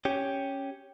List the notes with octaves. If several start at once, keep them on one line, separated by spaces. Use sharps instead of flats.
C#4 G4